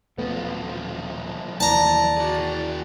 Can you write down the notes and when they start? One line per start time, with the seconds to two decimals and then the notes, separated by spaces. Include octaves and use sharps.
0.18 D#1 B1 F3 A3 B3
1.60 D#2 E3 D5 A5 A#5
2.17 F#4 G#4